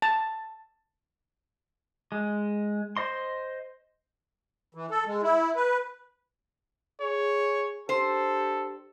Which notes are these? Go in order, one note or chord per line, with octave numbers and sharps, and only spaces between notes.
A5
G#3
C5 D#5 C6
E3
A4
G#3
E4
B4
G#4 C#5
D4 G4 A4 C5